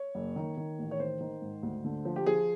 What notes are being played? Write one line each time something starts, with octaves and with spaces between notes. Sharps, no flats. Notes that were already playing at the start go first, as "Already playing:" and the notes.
Already playing: C#5
F#1
D#3
D#3
A1
C#5
D#3 C5
D#3
G#2
D2
D3
F3
G4
F3 G#4